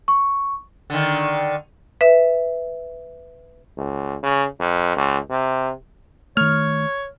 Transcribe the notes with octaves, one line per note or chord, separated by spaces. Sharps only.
C#6
D3 D#3
B4 E5
C#2
C#3
F2
C#2
C3
D#3 A3 C#5 F6